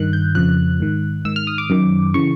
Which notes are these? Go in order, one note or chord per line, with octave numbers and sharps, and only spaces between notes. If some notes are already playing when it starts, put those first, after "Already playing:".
Already playing: G2 D#3 F#6
G6
F2 C#3 F3 F#6
G#2 D#3
G#2 D#3 E6
F6
D#6
D6
F#2 D#3
C#3 E3 C#6